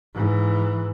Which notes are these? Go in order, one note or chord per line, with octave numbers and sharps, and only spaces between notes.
G#2 E3